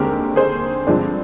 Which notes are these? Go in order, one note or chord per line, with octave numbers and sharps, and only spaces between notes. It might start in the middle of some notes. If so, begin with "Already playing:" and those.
Already playing: D#2 D3 G#3 C4 G4 A#4
G#4 C5
G2 D3 F3 G#3 C4 D4